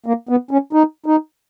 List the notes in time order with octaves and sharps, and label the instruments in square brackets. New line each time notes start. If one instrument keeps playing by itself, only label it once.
[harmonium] A#3
B3
C#4
D#4
D#4